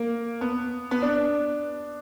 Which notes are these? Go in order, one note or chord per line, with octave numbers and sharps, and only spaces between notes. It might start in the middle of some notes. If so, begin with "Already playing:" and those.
Already playing: A#3
B3
B3
D4